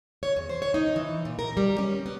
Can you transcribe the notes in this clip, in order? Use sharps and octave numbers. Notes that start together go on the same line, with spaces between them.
C#5
E2
C5
C#5
D#4
E3
A#2
A#4
G3
C#4
B3